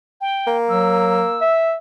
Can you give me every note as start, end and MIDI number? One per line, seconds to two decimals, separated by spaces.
0.21 0.57 79
0.47 1.45 58
0.69 1.24 54
0.69 1.65 88
1.41 1.75 76